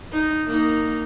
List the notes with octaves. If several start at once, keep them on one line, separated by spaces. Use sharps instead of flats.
D#4
A#3 D#4